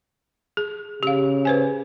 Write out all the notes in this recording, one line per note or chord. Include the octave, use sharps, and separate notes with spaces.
G#4
C#3 G4 F5
B4 C5 G#5